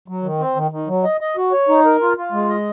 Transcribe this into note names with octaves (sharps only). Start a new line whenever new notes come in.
F#3
D#3
C4
D#3
D#3
F#3
D#5
D#5
F#4
C#5
D#4
A#4
F4
F4
G#3
D#5